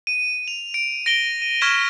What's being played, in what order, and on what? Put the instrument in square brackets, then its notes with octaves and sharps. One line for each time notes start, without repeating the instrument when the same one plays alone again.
[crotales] D#7
F7
D7
A#6 D7 D#7 G7
D#7
C#6 F6 G#6 B6 E7 G7